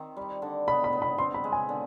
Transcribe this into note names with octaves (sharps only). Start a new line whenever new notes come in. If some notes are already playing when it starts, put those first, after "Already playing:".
Already playing: D#3 C4
G3
D3
B3 B5
B5
B3
B5
C4 C6
B5
G#3
G#5
D3